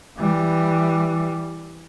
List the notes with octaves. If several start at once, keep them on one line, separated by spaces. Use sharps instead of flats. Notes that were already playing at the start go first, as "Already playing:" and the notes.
E3 G3